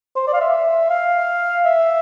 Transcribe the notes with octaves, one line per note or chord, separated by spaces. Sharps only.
C5
D5
F5
E5
F5
E5